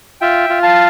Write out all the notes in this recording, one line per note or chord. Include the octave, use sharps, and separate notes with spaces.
F4 E5 G5
F4
F5 A5